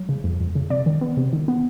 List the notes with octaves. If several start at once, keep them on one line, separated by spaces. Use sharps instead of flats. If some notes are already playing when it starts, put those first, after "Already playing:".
Already playing: F#3
C#3
F2
F2
C#3
C3 D5
D#3
B3
C3
D#3
B3